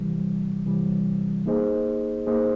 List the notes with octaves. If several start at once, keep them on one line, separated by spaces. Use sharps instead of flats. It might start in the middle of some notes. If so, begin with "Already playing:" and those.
Already playing: C3 E3 G3
C3 E3 G3
A#3 D#4 G#4 C5 D#5
A#3 D#4 G#4 C5 D#5